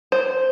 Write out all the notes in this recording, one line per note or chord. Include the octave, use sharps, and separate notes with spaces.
C5